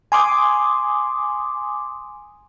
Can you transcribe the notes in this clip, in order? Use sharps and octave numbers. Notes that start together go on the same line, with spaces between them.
G#5 C6 D6 D#6